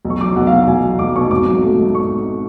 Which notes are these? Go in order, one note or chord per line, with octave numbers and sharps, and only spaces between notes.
B1
C#6
F#3 D6
B1 F#5
F5
B2
F#5
B1 G#5
F#3
B1 D6
B2 C#6
G#1 D6
F#3
A3
G#2
C#6